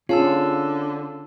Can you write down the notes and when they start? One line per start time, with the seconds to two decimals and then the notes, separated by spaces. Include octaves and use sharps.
0.09 D3 C#4 F4 G#4 F5 A5 E6